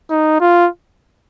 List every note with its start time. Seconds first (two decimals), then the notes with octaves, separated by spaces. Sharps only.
0.10 D#4
0.40 F4